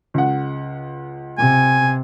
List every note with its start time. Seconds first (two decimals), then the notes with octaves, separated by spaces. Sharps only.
0.14 C#2 F#5
1.38 C3 G#5